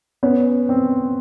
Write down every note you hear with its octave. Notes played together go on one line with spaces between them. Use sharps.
B3 C#4
C4